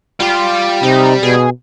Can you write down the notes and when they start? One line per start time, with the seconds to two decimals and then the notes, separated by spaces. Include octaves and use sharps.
0.20 G3 F4 G4
0.83 C3 D#4
1.23 B2 G#4